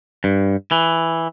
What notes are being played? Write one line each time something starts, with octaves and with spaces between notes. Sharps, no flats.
G2
E3